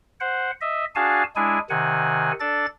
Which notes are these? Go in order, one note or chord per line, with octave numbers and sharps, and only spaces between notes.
C5 F#5
D#5 E5
D4 F#4 G#4 F5 G#5 A5
G#3 D4 E4 G#4 G#5
C3 D#3 F#5 G#5
D4 A4 D5 A6